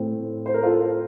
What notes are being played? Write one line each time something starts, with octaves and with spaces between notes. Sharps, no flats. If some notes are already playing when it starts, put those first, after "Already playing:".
Already playing: A2 A3 C4
C5
A#4
F4 A4